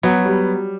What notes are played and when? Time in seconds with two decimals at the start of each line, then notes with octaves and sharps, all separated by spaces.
0.03 F#3 B3
0.26 G3